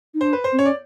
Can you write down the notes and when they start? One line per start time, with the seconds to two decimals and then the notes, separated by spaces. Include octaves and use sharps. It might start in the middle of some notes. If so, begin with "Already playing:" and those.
0.14 D#4
0.21 D4 C5
0.33 B4
0.44 C5
0.52 C4
0.59 C#4 C#5
0.65 D5